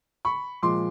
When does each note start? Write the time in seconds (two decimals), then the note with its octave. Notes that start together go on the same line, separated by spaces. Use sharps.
0.25 B5 C#6
0.62 A#2 F3 G#3 C6 D6